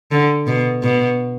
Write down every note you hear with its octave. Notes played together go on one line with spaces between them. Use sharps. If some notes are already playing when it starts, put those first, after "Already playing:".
D3
B2
B2